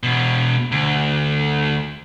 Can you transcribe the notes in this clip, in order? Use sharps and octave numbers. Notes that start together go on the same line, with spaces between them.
E2 B2
D2